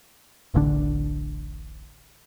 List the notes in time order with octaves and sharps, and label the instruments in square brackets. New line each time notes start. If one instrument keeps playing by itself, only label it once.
[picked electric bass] D1 A1 D3 D4